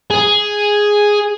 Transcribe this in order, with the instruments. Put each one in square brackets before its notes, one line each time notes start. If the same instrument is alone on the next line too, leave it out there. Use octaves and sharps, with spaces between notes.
[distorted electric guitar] G#4